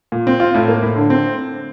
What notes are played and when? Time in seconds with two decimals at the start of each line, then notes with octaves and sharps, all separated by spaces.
0.12 A#2
0.27 C4
0.40 F4
0.54 A2
0.68 A#3
0.83 A2
0.96 D3
1.10 C4